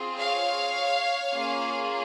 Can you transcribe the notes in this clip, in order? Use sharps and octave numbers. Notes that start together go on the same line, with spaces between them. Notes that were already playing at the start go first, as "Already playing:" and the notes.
Already playing: C4 F4 G#4
C#5 F5
A#3 C#4 F4 G#4